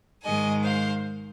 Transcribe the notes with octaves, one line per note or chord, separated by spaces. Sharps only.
G#2 D#3 G#3 D#5 G#5
C5 F5